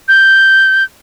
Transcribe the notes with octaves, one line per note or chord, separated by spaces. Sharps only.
G6